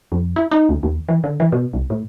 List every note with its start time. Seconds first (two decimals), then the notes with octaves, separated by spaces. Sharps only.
0.12 F2
0.36 E4
0.51 D#4
0.69 D2
0.83 D#2
1.09 E3
1.24 D3
1.40 E3
1.52 B2
1.73 C2
1.90 A2